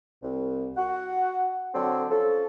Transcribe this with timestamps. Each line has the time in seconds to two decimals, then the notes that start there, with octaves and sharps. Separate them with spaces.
0.23 C2
0.77 F#4 F#5
1.75 D3 F#3 C4 A4
2.11 F3 C#4 A4